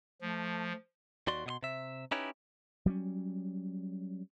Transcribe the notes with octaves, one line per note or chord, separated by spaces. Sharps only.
F3 A3
D#2 F#4 D5 C6
B2 D#5 C6
C3 E5
C#4 D#4 E4 G4 B4 C#5
F#3 G3 A#3 C#4